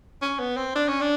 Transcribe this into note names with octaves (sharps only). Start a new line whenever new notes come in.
C#4
B3
C4
D4
C#4
D4